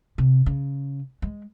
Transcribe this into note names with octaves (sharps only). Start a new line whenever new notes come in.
C3
C#3
G#3